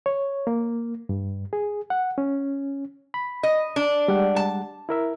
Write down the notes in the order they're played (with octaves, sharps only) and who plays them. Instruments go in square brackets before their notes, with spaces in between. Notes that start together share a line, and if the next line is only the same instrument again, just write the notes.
[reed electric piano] C#5
A#3
G2
G#4
F#5
C#4
B5
[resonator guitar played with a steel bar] D#5
D4
[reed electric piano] G3 G#3 F#5
[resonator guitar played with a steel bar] A5
[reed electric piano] E4 A#4 E5